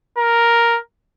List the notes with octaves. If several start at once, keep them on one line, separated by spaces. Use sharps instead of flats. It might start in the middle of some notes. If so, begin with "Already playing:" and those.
A#4